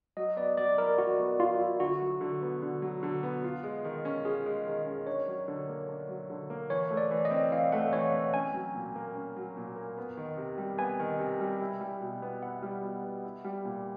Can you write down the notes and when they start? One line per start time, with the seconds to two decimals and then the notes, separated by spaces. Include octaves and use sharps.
0.17 F#3 D#5
0.37 B3 D5
0.57 F#3 D5
0.78 E4 A#4
0.98 F#3 F#4
1.19 B3
1.39 F#3 F4
1.60 E4
1.80 D3 F#4
2.01 F#3
2.21 D3
2.42 B3
2.62 D3
2.82 F#3
3.03 D3
3.23 B3
3.44 F4
3.64 G#3
3.85 D#3
4.05 C#4
4.25 F4 G#4
4.46 G#3
4.67 D#3
4.86 C#4
5.07 D4 C#5
5.27 F#3
5.48 D3
5.69 A#3
5.89 D4
6.09 F#3
6.30 D3
6.50 A#3
6.70 E3 C#5
6.91 A3
6.97 D5
7.11 E3
7.25 D#5
7.31 C4
7.51 E3 F5
7.72 A3 F#5
7.93 E3 C#5
8.13 C4
8.33 C#4 G#5
8.54 F#3
8.75 A#2
8.95 A#3
9.15 C#4
9.36 F#3
9.57 A#2
9.76 A#3
9.98 B3
10.17 D#3
10.37 C3
10.58 G3
10.78 B3 G#5
10.99 D#3
11.19 C3
11.40 G3
11.60 E4
11.81 G3
12.01 B2
12.22 B3
12.42 E4 F#5
12.62 G3
12.82 B2
13.03 B3
13.23 E4
13.45 G3
13.65 A#2